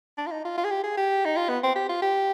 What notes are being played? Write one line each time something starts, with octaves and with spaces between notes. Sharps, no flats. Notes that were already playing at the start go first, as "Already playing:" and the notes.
D4
F4
D#4
F4
F4
G#4
G4
G#4
G4
D#4
F4
B3
C4
G4
F4
G4